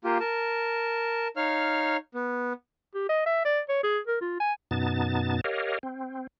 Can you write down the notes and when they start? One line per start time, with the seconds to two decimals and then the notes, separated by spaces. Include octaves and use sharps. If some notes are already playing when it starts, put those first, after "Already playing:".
0.04 A#3 F4 G4
0.20 A#4 A5
1.37 D#4 C#5 F5 F6
2.15 B3
2.95 G4
3.09 D#5
3.26 E5
3.45 D5
3.69 C#5
3.83 G#4
4.07 A#4
4.21 F4
4.40 G#5
4.71 F#2 B2 B3 D#4 A5 A6
5.44 G4 A#4 C#5 D#5 F5
5.83 C4